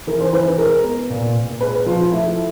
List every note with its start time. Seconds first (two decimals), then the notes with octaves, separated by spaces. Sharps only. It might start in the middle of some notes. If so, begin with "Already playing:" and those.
0.07 E3 A#4
0.20 C5
0.33 E3 B4
0.58 G#3 A#4
0.84 B3
1.10 A#2
1.35 A#2
1.61 G#3 B4
1.86 F3 F4
2.12 A3 E4